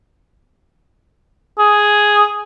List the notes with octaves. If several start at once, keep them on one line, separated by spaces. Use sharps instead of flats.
G#4